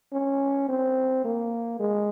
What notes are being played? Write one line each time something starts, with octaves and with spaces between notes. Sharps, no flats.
C#4
C4
A#3
G#3